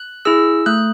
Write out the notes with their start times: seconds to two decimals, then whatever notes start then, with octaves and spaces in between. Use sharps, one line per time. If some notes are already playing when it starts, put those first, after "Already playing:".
Already playing: F#6
0.25 E4 G#4 E6
0.66 A3 F#6